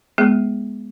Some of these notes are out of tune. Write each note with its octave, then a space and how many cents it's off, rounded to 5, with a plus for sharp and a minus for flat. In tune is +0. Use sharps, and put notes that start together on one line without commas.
G#3 +0 B3 -10 G#4 +0